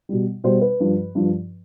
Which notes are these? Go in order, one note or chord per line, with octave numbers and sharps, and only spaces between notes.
B2 G3
B2 G3 C5
B4
G2 F3
G2 F3